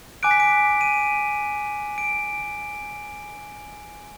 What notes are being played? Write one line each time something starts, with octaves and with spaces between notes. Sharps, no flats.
G#5 D6 F#6 D7
B6
D7
D#7
D7